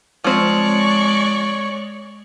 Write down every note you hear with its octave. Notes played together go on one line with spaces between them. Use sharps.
F3 G#3 C4 C#5 D5 C#6